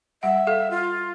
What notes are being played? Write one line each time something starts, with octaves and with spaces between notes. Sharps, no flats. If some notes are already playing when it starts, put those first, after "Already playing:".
G3 E5 F#5
A4 F5
F4